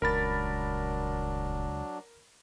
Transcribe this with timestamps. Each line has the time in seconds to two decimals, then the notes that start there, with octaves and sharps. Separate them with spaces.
0.02 D#1 C#2 F#3 D4 A#4 B5 A6